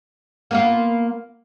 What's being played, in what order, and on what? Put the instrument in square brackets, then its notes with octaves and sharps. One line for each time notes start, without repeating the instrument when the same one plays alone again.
[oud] A#3 B3 F4